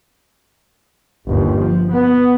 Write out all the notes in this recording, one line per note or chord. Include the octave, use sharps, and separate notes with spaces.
G1 D#2
F3
B3